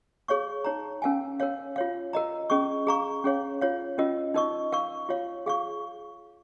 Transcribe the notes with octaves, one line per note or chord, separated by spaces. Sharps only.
G#4 C#5 F5 C#6
D#4 C#5 A#5
C#4 A#4 F5 G#5
A#4 C#5 F5
F4 C#5 F5
A#4 D#5 A#5
C#4 G#4 D#5 C#6
G#4 F5 A#5 C#6
C#4 G#4 C#5 F5
F4 C#5 F5
C#4 F4 A#4 D#5
D#4 A#4 D#5 C#6
A#4 F5 C#6
F4 C#5 F5
G#4 F5 C#6